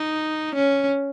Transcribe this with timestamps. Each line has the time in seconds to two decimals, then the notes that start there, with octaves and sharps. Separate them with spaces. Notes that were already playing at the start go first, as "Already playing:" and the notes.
Already playing: D#4
0.55 C#4